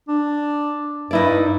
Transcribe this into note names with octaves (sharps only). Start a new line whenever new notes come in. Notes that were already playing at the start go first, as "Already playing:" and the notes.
D4
G2 D#4 E4 D5